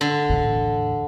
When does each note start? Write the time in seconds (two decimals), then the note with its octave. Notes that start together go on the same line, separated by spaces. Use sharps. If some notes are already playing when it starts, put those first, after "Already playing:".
0.01 D3
0.29 E2 A2